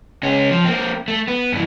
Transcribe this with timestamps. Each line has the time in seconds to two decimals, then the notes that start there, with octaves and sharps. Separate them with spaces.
0.23 C#2 C#4
0.51 F3
0.64 A#3 C4
1.08 A3
1.28 B3
1.53 G2 E3